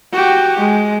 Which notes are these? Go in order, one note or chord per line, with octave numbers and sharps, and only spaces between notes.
F#4 G4
G#3